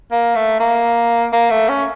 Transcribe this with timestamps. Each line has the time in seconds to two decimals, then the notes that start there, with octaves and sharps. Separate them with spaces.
0.11 A#3
0.35 A3
0.60 A#3
1.33 A#3
1.50 A3
1.69 C#4